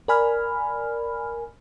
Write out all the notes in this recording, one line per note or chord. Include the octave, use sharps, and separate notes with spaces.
A#4 D5 G#5 B5 F6